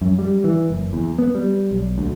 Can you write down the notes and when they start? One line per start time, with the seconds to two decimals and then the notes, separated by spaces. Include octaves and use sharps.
0.01 F#2
0.19 G3
0.44 E3
0.70 F#1
0.93 E2
1.19 B3
1.35 G3
1.71 B1
1.98 D2